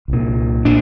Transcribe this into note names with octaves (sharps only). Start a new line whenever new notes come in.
C2 A#2
A#2 D4